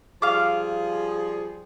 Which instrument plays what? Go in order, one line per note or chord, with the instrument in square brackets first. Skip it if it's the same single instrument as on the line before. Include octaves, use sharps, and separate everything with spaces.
[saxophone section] F3 G3 G#4 [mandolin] F5 D6